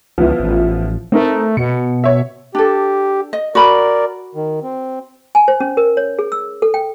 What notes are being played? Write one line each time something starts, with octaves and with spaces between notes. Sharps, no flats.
C#2 F3 B3 E4
A1
A3 C4 D#4 A#4
B2 C#7
C#5 E5
D4 G4 A4
D#5
F#4 A#4 D5 B5
D#3
C4
G#5
C5
C#4
A#4
C#5
G#4
E6
A4
G5